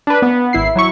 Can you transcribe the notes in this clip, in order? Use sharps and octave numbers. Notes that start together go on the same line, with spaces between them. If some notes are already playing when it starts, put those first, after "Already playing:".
D4 B4
B3
G#1 E4 C7
F#3 E4 C#6